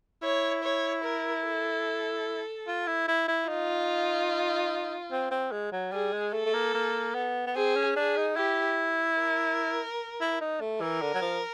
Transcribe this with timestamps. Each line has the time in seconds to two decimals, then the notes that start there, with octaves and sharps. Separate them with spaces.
0.22 E4 C#5
0.63 C#5
1.03 A#4
1.45 A4
2.68 F4
2.87 E4
3.08 E4
3.28 E4
3.48 D#4 F4
5.12 C4
5.31 C4
5.52 G#3
5.72 F#3
5.92 G3 G#4
6.13 G#3
6.33 A3 A4
6.46 A3
6.53 A#3
6.74 A#3
7.14 B3
7.47 B3
7.55 C4 G#4
7.76 C#4
7.96 D4 G#4
8.16 D#4
8.36 E4 G4
9.18 A#4
10.21 E4
10.41 D#4
10.61 A3
10.81 E3 A#4
11.02 D3
11.14 F#3
11.22 F3